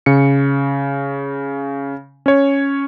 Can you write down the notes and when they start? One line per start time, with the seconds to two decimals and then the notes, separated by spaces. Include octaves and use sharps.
0.06 C#3 C#7
2.26 C#4 C#5